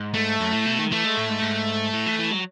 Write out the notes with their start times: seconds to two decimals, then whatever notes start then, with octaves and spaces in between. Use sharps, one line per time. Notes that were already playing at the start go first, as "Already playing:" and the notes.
Already playing: G#2
0.15 A3
0.40 F#2
0.52 A2
0.66 B2
0.79 D#3
0.91 E3 A3
1.04 G#3
1.17 A2
1.29 G#2
1.42 G#2
1.93 A2
2.06 E3
2.19 E3
2.31 F#3